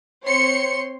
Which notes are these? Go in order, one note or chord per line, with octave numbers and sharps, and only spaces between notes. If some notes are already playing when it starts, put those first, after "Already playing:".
C4 C#5 C6 C#7